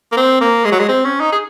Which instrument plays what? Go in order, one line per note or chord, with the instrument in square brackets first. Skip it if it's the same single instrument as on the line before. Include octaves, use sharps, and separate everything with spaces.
[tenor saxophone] A#3
C4
A#3
G#3
F#3
G#3
C4
C#4
D#4
G#4